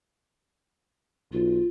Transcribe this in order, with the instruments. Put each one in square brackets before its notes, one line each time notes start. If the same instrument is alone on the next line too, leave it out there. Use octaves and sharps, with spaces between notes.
[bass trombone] B1 [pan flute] F4